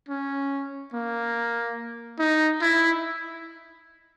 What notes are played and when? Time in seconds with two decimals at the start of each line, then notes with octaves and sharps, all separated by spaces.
0.09 C#4
0.94 A#3
2.19 D#4
2.62 E4